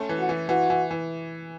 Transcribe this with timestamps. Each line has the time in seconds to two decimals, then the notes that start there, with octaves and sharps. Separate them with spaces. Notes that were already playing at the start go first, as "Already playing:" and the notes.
Already playing: A3 C#4
0.09 E3
0.19 F#4
0.29 E3
0.49 E3 F#4
0.70 E3
0.91 E3